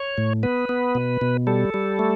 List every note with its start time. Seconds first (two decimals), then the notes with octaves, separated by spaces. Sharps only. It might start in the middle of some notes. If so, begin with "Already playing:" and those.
Already playing: C#5
0.18 A2
0.43 B3 B4
0.69 B3
0.95 B2
1.21 B2
1.47 G3 A4
1.74 G3
1.99 A3